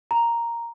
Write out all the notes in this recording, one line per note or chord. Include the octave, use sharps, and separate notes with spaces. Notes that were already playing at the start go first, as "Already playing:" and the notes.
A#5